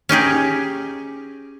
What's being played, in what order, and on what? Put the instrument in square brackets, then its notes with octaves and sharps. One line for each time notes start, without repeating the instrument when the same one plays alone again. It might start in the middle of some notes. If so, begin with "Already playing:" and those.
[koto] C#4 D#4 G4 G#4